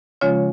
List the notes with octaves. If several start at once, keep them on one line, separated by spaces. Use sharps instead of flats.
C#3 F3 G#3 C#4 F4 C#5